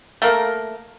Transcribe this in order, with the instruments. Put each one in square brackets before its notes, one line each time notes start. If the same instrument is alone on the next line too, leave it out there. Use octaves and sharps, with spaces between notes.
[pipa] A3 A#3 A#4